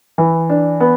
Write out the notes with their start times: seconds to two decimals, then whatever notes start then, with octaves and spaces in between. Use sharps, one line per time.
0.18 E3
0.50 D4
0.80 B3